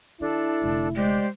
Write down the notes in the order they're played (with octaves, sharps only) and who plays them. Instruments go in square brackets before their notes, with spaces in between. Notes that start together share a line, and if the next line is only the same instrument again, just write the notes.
[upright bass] D#3 [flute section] D4 A4 [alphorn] E4
[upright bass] F1 D3
[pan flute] G#3 [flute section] G4 C5 D5